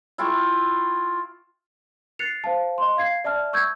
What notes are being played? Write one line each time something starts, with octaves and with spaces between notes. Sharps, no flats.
E4 F4 G5 C#6
F#6 A6 C7 C#7 F7
C5 F5 A5
D#5 C6
F5 G#6 C7
D5 E5 A5 F6
C#6 E6 G6 G#6